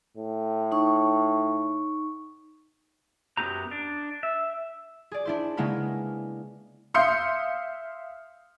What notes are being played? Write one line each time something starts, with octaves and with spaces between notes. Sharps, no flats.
A2
D#4 C#6
F#2 F#3 B3 D#4 G4 A#5
D4
E5
G#4 D5
D4 E4 C5
C#3 G#3 A#3 B3 E4 B4
E5 F5 C6 D#6 G6 C#7